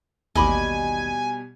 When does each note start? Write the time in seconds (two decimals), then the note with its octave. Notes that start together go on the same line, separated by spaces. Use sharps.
0.35 A1 D#2 B2 G3 D#5 G#5 B5 D6